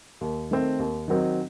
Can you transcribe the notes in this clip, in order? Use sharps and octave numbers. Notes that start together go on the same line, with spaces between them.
D#2
D#3 A3 C4
D#2
D#3 F#3 C4 D#4